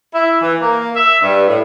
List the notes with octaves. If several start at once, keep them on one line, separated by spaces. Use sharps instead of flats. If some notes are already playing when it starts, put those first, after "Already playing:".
E4
E3
A#3
E5
G2
A2